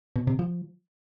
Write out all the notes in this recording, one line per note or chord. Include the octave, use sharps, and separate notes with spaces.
B2
C3
F3